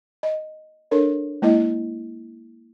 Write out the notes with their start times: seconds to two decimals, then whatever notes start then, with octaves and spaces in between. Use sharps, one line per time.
0.23 D#5
0.91 D4 A4 A#4 C#5
1.42 G#3 A#3 E4 D#5